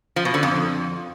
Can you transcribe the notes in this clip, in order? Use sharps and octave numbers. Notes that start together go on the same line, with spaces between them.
F3
B2
D3
F2